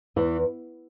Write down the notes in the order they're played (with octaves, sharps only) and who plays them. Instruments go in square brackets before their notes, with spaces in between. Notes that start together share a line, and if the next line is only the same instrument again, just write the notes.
[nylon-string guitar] E2 E3